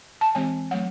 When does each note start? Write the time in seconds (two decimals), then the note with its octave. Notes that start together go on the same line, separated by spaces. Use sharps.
0.21 A5
0.35 E3 G#3 C4 G#5
0.71 F#3 A3 F#5